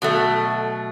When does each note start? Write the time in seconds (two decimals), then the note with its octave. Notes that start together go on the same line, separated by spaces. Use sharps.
0.02 B2 F#3 A3